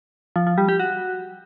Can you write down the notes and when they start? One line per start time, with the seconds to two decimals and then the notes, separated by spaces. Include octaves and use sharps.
0.36 F3
0.47 F3
0.58 G3
0.69 G4
0.80 F#4